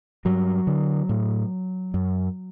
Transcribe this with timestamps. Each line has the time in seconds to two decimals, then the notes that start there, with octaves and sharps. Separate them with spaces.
0.25 G2 F#3
0.67 D3
1.09 A2
1.94 F#2